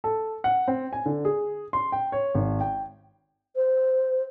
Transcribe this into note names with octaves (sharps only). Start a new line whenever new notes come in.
A4
F#5
C4
G#5
D3
G#4
C6
G5
C#5
G#1
G5
C5